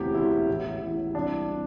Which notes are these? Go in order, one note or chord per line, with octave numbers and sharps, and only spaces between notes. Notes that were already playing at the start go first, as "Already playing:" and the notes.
Already playing: E1 D2 C3 E3 G4
E1 D2 C3 E3 E4
A1 A2 E3
A1 A2 E3
C2 C3 E3 D4
C3